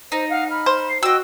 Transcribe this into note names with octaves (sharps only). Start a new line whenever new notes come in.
D#4 C5
F5 F#5
B5 F6
C5
C7
F#4 D#5 G5 E6